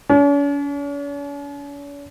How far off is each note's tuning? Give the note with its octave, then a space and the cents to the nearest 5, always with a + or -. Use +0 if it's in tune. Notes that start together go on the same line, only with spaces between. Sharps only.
C#4 +45